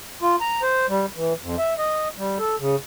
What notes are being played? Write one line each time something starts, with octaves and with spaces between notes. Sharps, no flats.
F4
A#5
C5
G3
E3
F2
E5
D#5
G3
A4
C#3